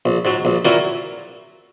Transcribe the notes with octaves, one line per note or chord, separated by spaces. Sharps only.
A#1
G#2 F#3
A#1
A#2 F#3 A#3 E4